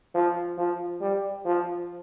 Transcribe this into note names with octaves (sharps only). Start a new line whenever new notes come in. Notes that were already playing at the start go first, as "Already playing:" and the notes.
F3
F3
G3
F3